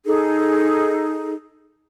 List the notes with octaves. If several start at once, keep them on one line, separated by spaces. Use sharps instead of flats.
D#4 G#4 A4